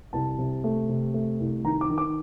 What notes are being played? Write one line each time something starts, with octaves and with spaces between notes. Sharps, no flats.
C2 A5
C3
A3
C3
A3
C2
D#3 A#5
D6
D#3
D6